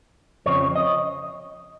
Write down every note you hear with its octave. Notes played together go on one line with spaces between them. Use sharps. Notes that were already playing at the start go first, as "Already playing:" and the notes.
F2 C#3 F3 C4 C#5
D#5